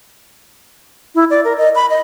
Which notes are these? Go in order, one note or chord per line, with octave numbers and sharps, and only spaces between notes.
E4
D5
A#4
D#5
B5
D#5